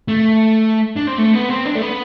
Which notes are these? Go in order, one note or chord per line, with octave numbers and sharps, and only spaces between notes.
A3
D4
C4
A3
B3
C4
D4
A3
B3